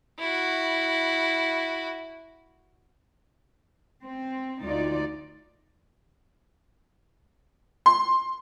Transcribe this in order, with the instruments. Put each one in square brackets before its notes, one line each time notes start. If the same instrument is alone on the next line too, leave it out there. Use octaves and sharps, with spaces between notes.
[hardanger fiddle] E4 F#4
[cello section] C4
D2 D#4 F4 D5
[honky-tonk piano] C6